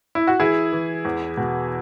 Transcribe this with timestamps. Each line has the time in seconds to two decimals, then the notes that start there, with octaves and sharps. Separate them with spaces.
0.15 E4
0.27 F#4
0.40 E3 E4 G#4
0.72 E3
1.05 E2
1.37 B2